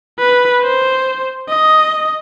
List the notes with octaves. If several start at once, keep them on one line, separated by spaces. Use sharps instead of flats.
B4
C5
D#5